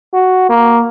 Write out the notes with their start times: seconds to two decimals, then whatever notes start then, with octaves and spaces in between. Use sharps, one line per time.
0.13 F#4
0.50 A#3